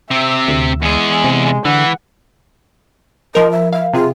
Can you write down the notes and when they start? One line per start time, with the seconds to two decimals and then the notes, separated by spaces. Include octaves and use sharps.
0.11 C3 C4 E5
0.48 D2
0.82 E2 G#3 G#4
1.24 C3
1.65 D3 E3 F#5
3.35 F3 A#4 D#5
3.51 E5
3.73 E5 F5
3.93 C3 F4 G#4